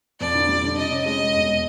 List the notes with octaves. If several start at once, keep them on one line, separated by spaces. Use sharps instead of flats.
F2 D5
D3
G3
D3
C3 D#5
C#4
G#3 D#5
G#3
E1